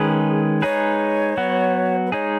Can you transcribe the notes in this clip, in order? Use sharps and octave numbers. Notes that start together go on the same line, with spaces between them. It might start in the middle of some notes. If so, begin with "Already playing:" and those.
Already playing: D#3 G#3 C#4 G#4 B4
G#3 D#4 G#4 B4 C#5
F#3 B3 F#4
B4
G#3 D#4 G#4 C#5